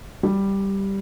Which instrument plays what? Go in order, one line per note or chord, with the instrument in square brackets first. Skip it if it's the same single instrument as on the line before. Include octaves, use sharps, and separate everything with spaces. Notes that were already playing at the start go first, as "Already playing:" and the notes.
[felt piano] G3